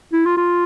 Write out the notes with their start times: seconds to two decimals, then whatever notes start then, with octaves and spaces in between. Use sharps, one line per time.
0.12 E4
0.25 F4
0.37 F4